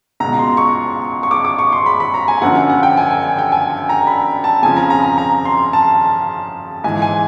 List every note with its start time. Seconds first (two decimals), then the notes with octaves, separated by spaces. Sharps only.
0.20 C#2 B2 A#5
0.39 C6
0.57 C#6
1.23 C#6
1.31 D6
1.45 D6
1.59 C#6
1.72 C6
1.86 B5
2.00 B5
2.14 A#5
2.28 G#5
2.41 F#2 D3 F3 F#5
2.70 F#5
2.83 G5
2.97 G#5
3.11 G#5
3.39 G5
3.52 G#5
3.89 A#5
4.07 B5
4.44 A5
4.62 F2 C#3 F3 G#5
4.77 A#5
4.90 A#5
5.04 A#5
5.18 A#5
5.45 C6
5.73 A5
6.84 G#2 E3 G#5
7.02 G#5